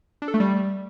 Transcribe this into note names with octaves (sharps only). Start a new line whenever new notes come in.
D4
A4
A3
G3